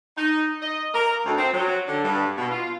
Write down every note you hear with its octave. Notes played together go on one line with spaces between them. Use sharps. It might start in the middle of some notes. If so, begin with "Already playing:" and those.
D#4
D#5
A#4
D2
C4
F#3
D3
G2
B2
F4